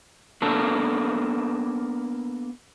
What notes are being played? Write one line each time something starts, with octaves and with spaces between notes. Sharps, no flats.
A#3 B3 D4 A4 A#4